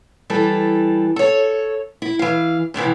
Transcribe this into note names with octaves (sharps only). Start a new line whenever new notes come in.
E3 G3 A4
A4 C#5
E4
E3 F5
F2 G#2 C3 E3